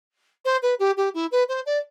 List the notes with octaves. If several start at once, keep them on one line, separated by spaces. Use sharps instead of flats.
C5
B4
G4
G4
E4
B4
C5
D5